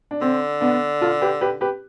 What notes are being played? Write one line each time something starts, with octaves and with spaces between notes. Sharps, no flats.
D4
D3 C4
B3 D4
F4 A4
G4 B4
G4 B4
G4 B4